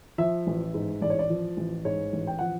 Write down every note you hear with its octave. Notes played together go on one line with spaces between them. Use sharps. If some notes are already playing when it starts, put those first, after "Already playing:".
F3 E5
A1
G#2
A1 D5
C#5
D5
F3
A1
G#2 C#5
A1
G5
F3 F#5